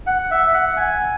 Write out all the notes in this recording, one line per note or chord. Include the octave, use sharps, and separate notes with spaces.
F#5
E5
F#5
G#5